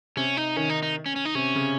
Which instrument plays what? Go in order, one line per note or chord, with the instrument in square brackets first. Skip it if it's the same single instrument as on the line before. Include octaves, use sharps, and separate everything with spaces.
[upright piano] C3 [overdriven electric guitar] C#4
[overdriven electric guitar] D#4
[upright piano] D#3 [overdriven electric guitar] C#4
[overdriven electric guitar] D#4
D#4
C#4
C#4
D#4
[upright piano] C3 [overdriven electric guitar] C#4
[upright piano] C#3